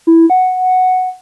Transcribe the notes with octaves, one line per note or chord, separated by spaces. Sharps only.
E4
F#5